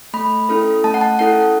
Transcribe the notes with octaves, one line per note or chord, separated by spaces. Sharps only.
A3 B5
C#4 E4 A4
A3 A5
F#5
A5
C#4 E4 A4 F#5